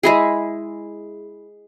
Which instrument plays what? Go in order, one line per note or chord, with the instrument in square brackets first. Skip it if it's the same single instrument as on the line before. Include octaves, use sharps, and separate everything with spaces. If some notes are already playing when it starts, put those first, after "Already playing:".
[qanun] G#3 E4 G#4